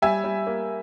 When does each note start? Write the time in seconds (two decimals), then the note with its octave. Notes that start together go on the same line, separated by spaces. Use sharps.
0.02 G3 E5 G#5
0.24 G3
0.47 A#3